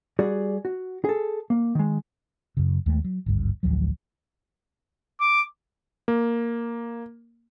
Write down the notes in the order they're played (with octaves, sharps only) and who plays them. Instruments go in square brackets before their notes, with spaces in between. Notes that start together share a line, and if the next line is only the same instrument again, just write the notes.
[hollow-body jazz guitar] G3 F#4 G#4 D5
F#4
G#4 A4
A#3
D#3 G#3
[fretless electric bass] F#2 C#3
D#2 G#3 A3
F#3
G#1 D2 G2
A1 D2 F3 F#3
[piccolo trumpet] D6
[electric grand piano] A#3